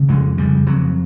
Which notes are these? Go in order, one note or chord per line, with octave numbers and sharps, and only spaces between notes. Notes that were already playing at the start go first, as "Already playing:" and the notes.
Already playing: C#3
F2 G#3
C#3 G3
F2 F#3